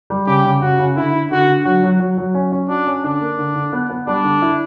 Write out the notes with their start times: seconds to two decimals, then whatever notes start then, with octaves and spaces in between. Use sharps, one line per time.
0.10 G3
0.27 C#3 G4
0.45 C#3
0.62 C#3 F#4
0.79 C#3
0.96 D3 E4
1.13 D3
1.31 D3 F#4
1.48 D3
1.65 F#3 F#4
1.83 F#3
2.00 F#3
2.18 F#3
2.34 C#4
2.52 C#4
2.69 D4 F#4
2.87 C#4
3.04 D3 D4
3.21 A#3
3.38 D3
3.56 D3
3.73 B3
3.90 B3
4.07 G3 D4
4.24 D3
4.42 E4